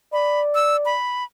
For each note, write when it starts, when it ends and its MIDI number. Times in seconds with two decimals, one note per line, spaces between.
0.13 0.95 74
0.13 0.40 83
0.55 0.76 88
0.85 1.24 83